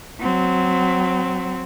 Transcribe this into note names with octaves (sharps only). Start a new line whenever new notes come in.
F#3 C4